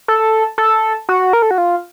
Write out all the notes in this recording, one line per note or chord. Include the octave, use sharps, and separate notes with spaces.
A4
A4
F#4
A#4
A4
F#4
F4